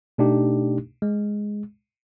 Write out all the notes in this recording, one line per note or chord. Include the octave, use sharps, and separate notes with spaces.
B2 A3 D4 D#4 G4
G#3